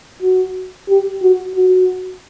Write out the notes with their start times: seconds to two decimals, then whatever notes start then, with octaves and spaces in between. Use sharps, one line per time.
0.22 F#4
0.89 G4
1.22 F#4
1.56 F#4